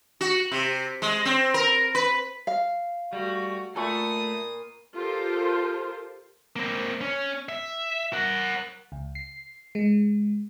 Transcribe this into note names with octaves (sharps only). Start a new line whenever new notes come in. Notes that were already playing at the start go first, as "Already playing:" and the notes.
F#4
C3
G#3
C4
A#4
B4
F5
G3 A3 F#4
A#2 A3 A4 B5 C#6 D#6 C7
F4 G4 A4 A#4 C5
A#3 C4
C#4
E5
A#4 F#5
C#2
C7
G#3